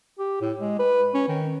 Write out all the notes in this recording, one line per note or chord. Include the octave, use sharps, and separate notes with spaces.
G4
A2
G#3
B4
C#4
D#3